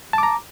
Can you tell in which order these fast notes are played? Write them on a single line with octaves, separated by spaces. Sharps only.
A5 D6 A#5